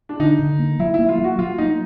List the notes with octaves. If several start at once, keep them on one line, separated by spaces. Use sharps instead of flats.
D4
D3 D#4
D3
A#3
F#3 E4
A#3 E4
F4
F#3
F#4
F#3 F4
A#3 D#4